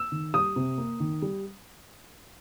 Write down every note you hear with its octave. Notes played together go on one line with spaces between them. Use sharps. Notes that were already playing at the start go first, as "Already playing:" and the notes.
Already playing: E6
D#3
G3 D#6
C3
A#3
D#3
G3